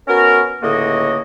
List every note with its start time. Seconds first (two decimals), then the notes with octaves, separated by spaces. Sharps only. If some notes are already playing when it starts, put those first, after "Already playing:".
0.08 B3 C#4 F#4 A#4
0.63 C#2 A2 D3 A#3 F#4 D#5